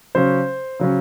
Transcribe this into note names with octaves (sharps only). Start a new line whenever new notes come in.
C#3 F#3 C#4 C5
C#3 F#3 C#4